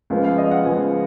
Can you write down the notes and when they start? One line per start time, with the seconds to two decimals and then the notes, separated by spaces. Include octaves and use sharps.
0.10 C#2 C#3 F3 B3
0.24 F5
0.38 D#5
0.51 F#5
0.65 C#2 C#3 F3 B3 G#5